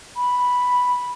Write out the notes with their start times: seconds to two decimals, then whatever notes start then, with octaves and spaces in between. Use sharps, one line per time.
0.16 B5